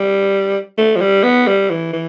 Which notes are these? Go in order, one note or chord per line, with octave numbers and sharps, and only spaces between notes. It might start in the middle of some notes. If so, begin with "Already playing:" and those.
Already playing: G3
A3
F3
G3
B3
G3
E3
E3